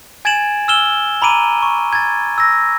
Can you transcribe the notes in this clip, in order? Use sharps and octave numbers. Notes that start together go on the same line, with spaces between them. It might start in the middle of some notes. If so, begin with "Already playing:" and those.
G#5 G#6 A6 D7 E7 F#7
E6 F6 E7 G7
A#5 B5 D6 D7 D#7
C#6
G#6 A6
E6 A#6